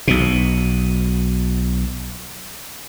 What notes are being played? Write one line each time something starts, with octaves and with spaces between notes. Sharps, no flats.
B1 B2